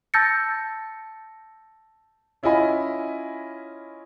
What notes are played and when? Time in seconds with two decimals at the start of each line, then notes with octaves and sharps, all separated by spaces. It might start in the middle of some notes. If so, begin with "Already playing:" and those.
0.14 A5 E6 G6 A6 A#6 C#7
2.43 C#4 E4 F4 D#5 G#5 B5